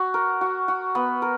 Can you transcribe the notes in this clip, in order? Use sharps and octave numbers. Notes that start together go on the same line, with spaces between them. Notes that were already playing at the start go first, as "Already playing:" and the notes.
Already playing: F#4
A#4
F#4
F#4
B3
A#4